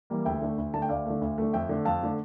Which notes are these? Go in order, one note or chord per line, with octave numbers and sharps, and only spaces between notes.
E3 G3 A#3
D2 E5 G5
D3 A3
D2
D3 A3 A5
G5
D2 D5 F5
D3 A3
D2
D3 A3
F2 E5 G5
D3 A3
F2 F5 A5
D3 A3